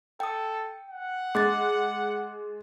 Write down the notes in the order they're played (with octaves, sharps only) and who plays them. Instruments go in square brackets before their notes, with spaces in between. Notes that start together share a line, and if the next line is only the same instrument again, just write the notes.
[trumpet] A4 [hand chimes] G5 D#6
[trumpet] F#5
[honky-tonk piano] G#3 [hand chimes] D6 F#6 A6